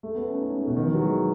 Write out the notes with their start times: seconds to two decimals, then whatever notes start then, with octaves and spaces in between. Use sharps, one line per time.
0.03 A3
0.15 B3
0.28 C#4
0.40 D#4
0.48 C#4
0.58 A3
0.67 B2
0.76 D#3
0.86 E3
0.95 F#3
1.03 G#3